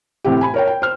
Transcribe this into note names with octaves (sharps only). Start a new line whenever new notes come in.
A2 C3 C4 E4 G4
G#5 B5
A#4 C#5 G5
G5
C5 F6